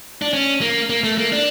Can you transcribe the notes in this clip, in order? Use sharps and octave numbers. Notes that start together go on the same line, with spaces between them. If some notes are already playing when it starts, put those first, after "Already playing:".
D4
C#4
A#3
A#3
A3
A#3
D4